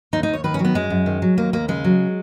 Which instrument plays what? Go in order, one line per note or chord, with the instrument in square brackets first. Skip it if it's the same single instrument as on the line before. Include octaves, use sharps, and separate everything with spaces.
[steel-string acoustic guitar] D#2 D#4
D#4
D#2 C#5
D#3 B4
C#4
F#3
B3
F#2 G#3
F#2
D#3
F#3
D#2 A#3
D#2 A#3
C#3 G#3
F#3